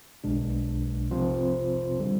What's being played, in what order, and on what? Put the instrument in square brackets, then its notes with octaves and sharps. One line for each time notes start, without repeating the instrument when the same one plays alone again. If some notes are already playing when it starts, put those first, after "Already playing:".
[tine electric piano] B1 B2 G#3 D4
C3 F3 C4 F4 C5
D3 G3